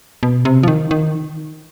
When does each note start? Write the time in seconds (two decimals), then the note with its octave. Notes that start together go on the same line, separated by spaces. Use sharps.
0.23 B2
0.45 C3
0.63 F3
0.68 D#3
0.91 D#3